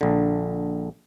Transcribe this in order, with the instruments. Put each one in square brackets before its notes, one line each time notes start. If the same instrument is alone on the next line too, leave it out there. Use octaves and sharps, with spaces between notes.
[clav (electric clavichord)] A#1 D3